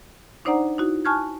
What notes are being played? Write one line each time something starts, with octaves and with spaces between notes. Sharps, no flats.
D4 D#4 C5 D5 F#5 A#5
D#4 E4 F#4
G#5 A5 C#6 F6 F#6 G#6